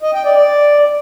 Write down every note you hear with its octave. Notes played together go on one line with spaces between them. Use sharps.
D#5
G5
D5
D5